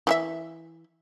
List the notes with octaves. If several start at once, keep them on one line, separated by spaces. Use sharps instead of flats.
E3 G#4 E5